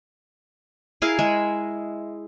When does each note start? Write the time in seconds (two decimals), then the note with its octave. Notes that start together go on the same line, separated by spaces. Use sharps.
1.02 E4 G#4 A#4 F5
1.19 G#3 E5